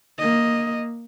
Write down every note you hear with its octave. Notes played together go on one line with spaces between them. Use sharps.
A#3 D#5